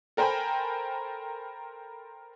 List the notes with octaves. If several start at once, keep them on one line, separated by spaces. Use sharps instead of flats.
A4 A#4 C5 G5 G#5 B5